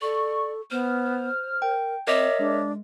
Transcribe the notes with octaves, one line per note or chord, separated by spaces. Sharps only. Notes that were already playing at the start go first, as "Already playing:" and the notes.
A4 D5 C#6
B3 C5 F6
A#4 G5
C4 A#4 C#5 D#5 E5 D6
G#3 D4